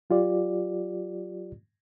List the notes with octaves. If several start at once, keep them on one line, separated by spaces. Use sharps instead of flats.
F#3 F4 G4 D5